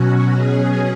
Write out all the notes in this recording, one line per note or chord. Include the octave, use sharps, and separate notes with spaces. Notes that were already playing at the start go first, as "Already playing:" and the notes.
Already playing: B2 F#3 C#4 F#4
G#4